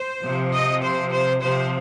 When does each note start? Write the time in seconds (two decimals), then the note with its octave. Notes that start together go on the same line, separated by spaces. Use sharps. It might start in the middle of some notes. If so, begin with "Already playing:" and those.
Already playing: C5
0.23 C3 F3
0.53 D#5
0.83 C5
1.12 C5
1.42 C3 F3 C5